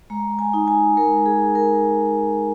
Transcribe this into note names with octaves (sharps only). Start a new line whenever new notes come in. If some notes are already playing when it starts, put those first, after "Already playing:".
G#3 A#5
G#5
D#4
G#5
G#3 A#4
G#4
D#4
A#4